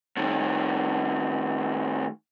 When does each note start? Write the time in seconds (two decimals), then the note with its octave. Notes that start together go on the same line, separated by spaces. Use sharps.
0.17 A2 D#3